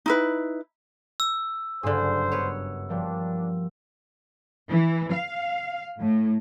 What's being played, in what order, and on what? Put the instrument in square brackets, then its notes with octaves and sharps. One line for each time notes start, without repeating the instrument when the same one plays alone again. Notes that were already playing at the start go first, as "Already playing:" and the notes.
[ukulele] D#4 E4 B4
[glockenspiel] E6
[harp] F#1 G2 [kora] D3 G#4 [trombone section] C5
[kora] B3 B4 C#5
[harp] F3 G3 A#3 [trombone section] D4
[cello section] E3
F5
A2